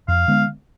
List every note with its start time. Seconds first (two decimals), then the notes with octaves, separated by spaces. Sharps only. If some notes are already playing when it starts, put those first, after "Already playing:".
0.08 F2 F5
0.28 D3 G#3 B3